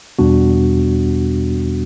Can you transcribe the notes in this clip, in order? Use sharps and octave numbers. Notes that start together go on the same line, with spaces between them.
E2 B2 G3 B3 D4 F#4